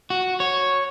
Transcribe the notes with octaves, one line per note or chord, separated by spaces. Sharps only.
F#4
C#5